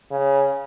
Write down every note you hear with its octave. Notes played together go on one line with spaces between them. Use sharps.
C#3